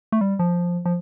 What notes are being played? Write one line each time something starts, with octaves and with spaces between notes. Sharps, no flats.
A3
G3
F3
F3